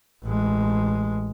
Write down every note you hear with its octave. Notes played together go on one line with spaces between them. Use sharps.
A1 G#3